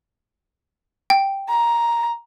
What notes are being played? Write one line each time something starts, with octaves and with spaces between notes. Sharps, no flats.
G5
A#5